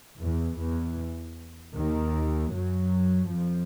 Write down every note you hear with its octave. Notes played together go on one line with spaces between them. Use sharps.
E2 E3
E2 E3
D#2 D#3
F#2 F#3
F2 F3